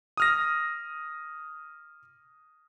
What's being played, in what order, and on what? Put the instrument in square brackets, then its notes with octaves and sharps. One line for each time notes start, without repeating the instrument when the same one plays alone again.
[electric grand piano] D#6 F6 A#6